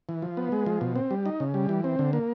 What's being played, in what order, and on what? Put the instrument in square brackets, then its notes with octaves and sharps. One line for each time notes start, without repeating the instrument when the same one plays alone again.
[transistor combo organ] E3
F3
B3
G#3
F3
B2
C4
G3
D#4
C#3
G3
E3
C4
D3
A#3